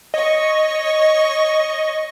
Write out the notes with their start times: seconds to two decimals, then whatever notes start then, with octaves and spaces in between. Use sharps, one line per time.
0.14 C#5 D#5 C#6